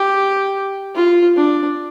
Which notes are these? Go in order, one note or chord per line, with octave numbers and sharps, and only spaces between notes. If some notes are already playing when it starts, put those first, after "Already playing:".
Already playing: G4
F4
D4